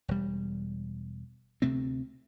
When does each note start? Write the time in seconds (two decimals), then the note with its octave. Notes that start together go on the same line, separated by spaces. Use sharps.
0.08 E1 G3
1.62 D2 C3 A3 C4